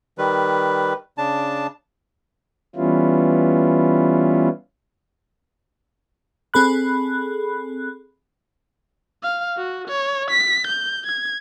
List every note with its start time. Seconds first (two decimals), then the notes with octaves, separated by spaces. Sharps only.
0.18 D#3 G3 B4
1.18 C#3 D4 A5
2.76 E3 G3 B3 C#4 E4 F4
6.54 C4 G#4 A4 B5 F#6
9.23 F5
9.58 F#4
9.88 C#5
10.31 B6
10.67 G6
11.07 G#6